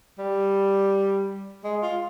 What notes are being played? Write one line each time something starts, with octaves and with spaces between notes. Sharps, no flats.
G3
G#3
F4